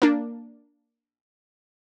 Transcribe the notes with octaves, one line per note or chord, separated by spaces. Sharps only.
A#3 D4